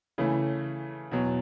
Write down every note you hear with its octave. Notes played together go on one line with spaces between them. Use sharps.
C#3 E3 A3
E2 B2 F#3